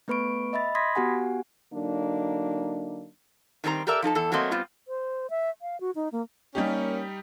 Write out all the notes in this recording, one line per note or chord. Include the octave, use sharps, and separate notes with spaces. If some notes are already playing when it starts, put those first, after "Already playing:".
A3 B3 B4 B5 C#6 D7
D#5 E5 B5 A6
B5 C6 D#6 G#6 A#6 B6
B3 F#4 G4 F#5 G#5
D3 F#3 A#3 D4 D#4
D#3 G3 C4 G#4 A#5
G4 A4 A#4 D5 E5
F3 D#4 A4 A5
E2 A4
F#3 A3 A#3 C4 D#5
G3 B3 C4 F4
C5
E5
F5
F#4
D#4
A#3
G3 A#3 C#4 D#4 G4